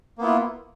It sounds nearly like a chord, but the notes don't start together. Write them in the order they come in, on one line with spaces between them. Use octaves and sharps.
A#3 B3 E4 F4